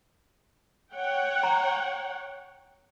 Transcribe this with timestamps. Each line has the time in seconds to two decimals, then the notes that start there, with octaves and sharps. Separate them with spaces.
0.92 C#5 F#5 G5
1.43 A#5